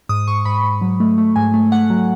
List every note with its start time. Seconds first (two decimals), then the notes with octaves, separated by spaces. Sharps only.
0.09 G#2 D#6
0.27 G#2 C#6
0.45 G#2 B5
0.63 G#2
0.81 F#3
1.00 A3
1.18 A3
1.36 G#2 G#5
1.54 A3
1.72 A3 F#5
1.90 F#3